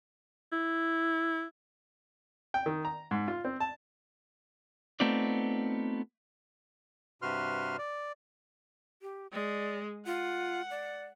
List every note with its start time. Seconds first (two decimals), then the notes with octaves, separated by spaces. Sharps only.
0.53 E4
2.54 G5
2.66 D#3
2.85 A#5
3.11 G#2
3.28 F4
3.45 C4
3.60 A5
5.00 A3 B3 C4 D#4 F4 D5
7.22 G2 C3 F#4 B4 C6 F6
7.79 D5
9.02 G4
9.33 G#3 D5
10.06 F4 F#5
10.71 D5